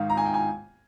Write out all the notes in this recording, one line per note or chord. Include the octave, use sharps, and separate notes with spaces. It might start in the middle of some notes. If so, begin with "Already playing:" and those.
Already playing: G#2 D#3 F5
A#5
G#5
G5
G#5